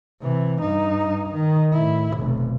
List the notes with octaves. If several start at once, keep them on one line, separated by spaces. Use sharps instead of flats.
C3 E3
G2 D#4
D#3
A2 E4
F1 B1